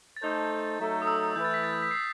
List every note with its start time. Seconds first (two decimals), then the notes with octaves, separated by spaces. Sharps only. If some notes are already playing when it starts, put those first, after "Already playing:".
0.17 A6
0.22 A3 D#4 A4 C5 G6
0.78 F#3 A3 D#4 A4
1.02 D#6
1.07 E6
1.35 E3 A3 E4 B4 G6
1.44 A6
1.54 B6
1.63 A6
1.73 G6
1.82 B6
1.91 C7